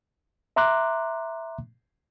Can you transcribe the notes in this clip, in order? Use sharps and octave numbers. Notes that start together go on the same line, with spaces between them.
E5 A#5 C6 D6 F#6